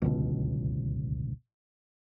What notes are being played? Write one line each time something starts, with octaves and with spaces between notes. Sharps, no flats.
D1 G1 C#2 B2